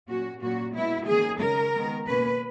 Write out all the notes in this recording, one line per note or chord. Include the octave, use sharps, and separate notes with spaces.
A#2 F#3 A#3 C#4 F#4
A#2 F#3 A#3 C#4 F#4
B2 G#3 B3 E4
D#3 F#3 A#3 C#4 G#4
C#3 G#3 C#4 A#4
D#3 G#3 B3
B2 A#3 C#4 B4